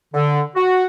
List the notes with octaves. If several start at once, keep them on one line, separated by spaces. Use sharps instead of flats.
D3
F#4